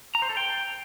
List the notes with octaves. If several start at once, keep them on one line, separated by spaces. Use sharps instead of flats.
A#5
C5
A4
G5